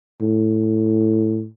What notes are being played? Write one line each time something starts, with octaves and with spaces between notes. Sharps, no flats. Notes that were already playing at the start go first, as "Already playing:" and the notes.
A2